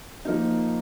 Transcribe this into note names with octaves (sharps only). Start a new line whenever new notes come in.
F3 A#3 D#4